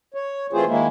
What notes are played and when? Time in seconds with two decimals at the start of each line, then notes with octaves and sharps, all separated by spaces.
0.14 C#5
0.53 E3 A3 C4 F4 G#4 C5
0.67 D#3 G#3 A#3 E4